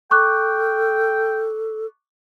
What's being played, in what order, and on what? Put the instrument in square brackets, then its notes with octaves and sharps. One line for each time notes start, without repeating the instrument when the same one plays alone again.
[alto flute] A4 [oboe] G5 [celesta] C#6 D6 F#6